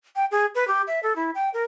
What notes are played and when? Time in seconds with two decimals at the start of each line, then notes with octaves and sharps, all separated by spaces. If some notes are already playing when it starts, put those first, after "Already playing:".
0.16 G5
0.31 G#4
0.55 B4
0.68 G4
0.87 E5
1.03 A4
1.16 E4
1.35 G5
1.54 A#4